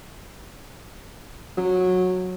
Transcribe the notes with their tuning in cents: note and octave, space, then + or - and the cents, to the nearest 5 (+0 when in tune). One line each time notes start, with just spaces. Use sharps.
F#3 -15